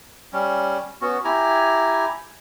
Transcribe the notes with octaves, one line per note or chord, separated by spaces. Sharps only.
G3 C#4
B3 C#4 F#4
E4 G4 G#5 A#5